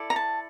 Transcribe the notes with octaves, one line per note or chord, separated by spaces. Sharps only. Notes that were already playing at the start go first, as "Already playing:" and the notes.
Already playing: E4 A4 D5
A#5
A5